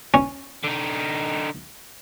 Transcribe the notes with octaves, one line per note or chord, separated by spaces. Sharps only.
C#4
D3 D#4